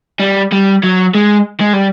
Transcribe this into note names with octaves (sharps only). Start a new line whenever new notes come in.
G3
G3
F#3
G#3
G#3
G3